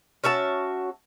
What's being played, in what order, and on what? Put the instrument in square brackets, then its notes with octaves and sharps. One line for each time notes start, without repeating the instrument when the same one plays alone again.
[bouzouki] C#4 F#4 E5 A5